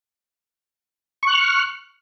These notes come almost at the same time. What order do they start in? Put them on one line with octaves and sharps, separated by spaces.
C#6 F#6 F6